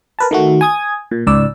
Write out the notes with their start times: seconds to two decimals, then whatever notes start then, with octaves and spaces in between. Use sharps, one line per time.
0.19 A#4 B4 A5
0.31 D#3 A3 F#4
0.61 G#5 D#6 G#6
1.11 A#2
1.27 C#2 G#2 D5 E6